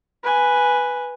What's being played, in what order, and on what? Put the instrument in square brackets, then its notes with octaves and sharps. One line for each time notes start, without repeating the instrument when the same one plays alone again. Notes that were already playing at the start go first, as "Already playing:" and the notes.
[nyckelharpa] B4 G#5